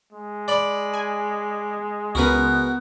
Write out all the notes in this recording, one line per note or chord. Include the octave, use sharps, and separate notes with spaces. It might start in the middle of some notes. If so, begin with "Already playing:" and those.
G#3
D5 B5
G#5
C#2 B3 F#4 A#4 B4